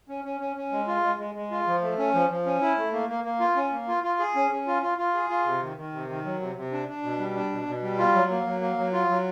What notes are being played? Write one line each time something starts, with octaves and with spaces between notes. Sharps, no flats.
C#4
C#4
C#4
C#4
G#3
F4
G#3
G#3
G#3
F4
F3
A3
C#4
F3
F3
C#4
E4
A3
A#3
A#3
A#3
F4
C#4
A#3
F4
F4
G#4
C#4
C#4
F4
F4
F4
G#4
F4
C3
D#3
D#3
C3
D#3
F#3
C3
C3
D4
D4
B2
G3
D4
B2
B2
G3
F4
F#3
A#3
F#3
A#3
F#3
F4
F#3